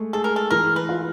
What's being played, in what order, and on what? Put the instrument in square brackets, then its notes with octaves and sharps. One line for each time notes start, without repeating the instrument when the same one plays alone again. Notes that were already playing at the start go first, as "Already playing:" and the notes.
Already playing: [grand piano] G#3 A3
[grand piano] G#4 [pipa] A4
[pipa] A#4
A4
[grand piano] E3 [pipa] A#4
[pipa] B4
[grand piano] F4